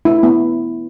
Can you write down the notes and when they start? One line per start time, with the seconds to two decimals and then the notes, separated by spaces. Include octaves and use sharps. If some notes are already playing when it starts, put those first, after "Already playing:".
0.05 E4
0.23 B3